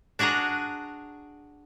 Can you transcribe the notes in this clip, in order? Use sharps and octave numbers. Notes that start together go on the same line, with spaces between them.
D4 F#4 G#4 F#5 A#5